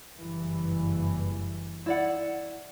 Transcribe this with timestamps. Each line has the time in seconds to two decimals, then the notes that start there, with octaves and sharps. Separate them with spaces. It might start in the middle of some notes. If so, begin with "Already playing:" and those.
0.16 F#1 G2 E3
1.86 E4 D5 F#5